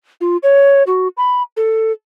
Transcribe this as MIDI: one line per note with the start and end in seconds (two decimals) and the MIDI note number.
0.21 0.37 65
0.43 0.83 73
0.87 1.08 66
1.17 1.43 83
1.57 1.92 69